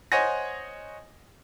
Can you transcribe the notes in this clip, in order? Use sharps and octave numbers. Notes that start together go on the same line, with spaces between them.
C5 C#5 D#5 F#5 G#5 A#6